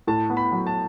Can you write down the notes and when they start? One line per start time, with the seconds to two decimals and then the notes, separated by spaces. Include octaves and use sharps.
0.07 A2 A5
0.30 B3
0.37 B5
0.52 F#3
0.67 A5